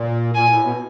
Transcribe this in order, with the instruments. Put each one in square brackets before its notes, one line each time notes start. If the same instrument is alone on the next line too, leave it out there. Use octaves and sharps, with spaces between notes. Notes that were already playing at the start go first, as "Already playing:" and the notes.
Already playing: [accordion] A#2
[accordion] A#2 [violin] G#5
[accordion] A2
B2